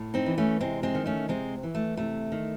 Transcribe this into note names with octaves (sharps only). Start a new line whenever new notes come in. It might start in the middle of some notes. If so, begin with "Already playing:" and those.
Already playing: A2
C4 D#4
E3
A3 C#4
C3 G#3 C4
G#3 C4
D#3
A3 C#4
C3 G#3 C4
E3
A3
C3 A3
D#3